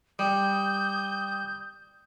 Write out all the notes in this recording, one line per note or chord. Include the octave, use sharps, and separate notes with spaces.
G3 D#6 G6